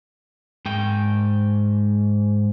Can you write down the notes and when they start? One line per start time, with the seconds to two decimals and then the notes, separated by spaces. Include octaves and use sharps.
0.66 G#2 G5